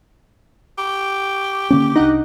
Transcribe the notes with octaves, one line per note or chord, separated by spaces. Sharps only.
G4
D3 A#3 C#4
C2 D4 D#4 F#5